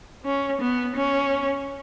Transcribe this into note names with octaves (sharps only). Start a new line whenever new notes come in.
C#4
B3
C#4